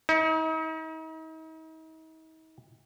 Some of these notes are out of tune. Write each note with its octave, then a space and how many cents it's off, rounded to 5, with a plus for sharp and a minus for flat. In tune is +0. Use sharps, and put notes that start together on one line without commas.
D#4 +40